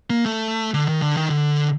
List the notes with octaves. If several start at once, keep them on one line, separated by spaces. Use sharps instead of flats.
A#3
A3
D3
D#3
D3
D#3
D3